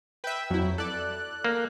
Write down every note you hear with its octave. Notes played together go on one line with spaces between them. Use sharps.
B4 E5 G5
F2 F#3 E4
A4 D5 F#6
A#3